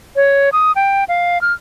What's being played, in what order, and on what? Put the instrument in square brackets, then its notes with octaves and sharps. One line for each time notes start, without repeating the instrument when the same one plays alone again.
[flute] C#5
D#6
G5
F5
F6